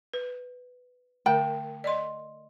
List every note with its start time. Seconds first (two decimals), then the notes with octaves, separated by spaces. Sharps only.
0.13 B4
1.26 D3 A3 A#4 G5 A5
1.84 D5 D#5 C6